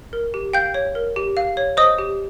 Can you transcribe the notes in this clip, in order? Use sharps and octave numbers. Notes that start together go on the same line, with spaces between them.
A#4
G4
F5 G5 G6
C#5
A#4
G4
F5
C#5
C5 D#5 D#6
G4